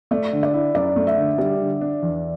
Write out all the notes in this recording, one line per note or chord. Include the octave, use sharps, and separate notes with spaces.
A3 D5
D3
D5
E4
F#2 D5
A3
E5
D3
G3
D3
D4
E2